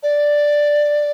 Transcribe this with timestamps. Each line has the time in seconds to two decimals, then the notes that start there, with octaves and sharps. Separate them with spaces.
0.03 D5